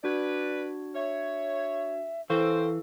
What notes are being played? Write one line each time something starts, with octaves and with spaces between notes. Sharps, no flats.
D4 F#4 B4 D5 G#6
C#5 E5
E3 C4 A4 C5 F5 C#6